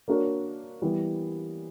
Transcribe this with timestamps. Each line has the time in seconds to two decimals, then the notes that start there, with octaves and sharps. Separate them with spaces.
0.08 A#3 D4 F#4 A#4 C#5
0.82 E3 G3 B3